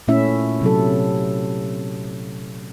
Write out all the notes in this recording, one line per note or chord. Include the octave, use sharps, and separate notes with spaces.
A#2 A3 C#4 E4 E5
C3 F#3 A4